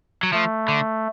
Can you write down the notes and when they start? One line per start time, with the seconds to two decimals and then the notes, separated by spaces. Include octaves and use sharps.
0.23 F#3
0.33 F3 A3
0.68 D3